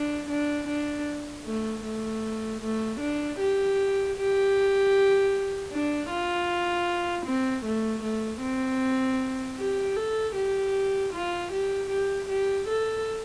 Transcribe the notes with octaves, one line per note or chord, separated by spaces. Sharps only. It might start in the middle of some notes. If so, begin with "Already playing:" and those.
Already playing: D4
D4
D4
A3
A3
A3
D4
G4
G4
D4
F4
C4
A3
A3
C4
G4
A4
G4
F4
G4
G4
G4
A4